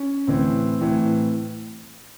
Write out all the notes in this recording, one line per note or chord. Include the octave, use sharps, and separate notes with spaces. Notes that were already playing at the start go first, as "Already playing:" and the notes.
Already playing: C#4
A2 E3 C4
A2 E3